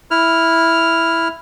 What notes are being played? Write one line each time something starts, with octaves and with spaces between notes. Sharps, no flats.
E4 F6